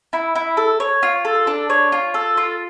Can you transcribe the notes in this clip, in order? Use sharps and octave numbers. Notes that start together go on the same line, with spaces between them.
E4
E4
A4
C#5
F4
A4
D4
C#5
F4
A4
F4